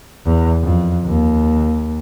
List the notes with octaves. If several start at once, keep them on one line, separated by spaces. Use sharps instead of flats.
E2
F2
D#2